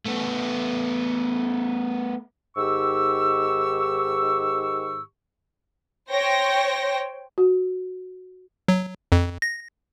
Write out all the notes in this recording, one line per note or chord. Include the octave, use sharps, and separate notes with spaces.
A3 B3
G#2 D#3 G4 C#6 E6
C5 C#5 G5 A#6
F#4
F#3
F2
A#6